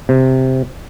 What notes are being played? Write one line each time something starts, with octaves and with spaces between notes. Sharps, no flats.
C3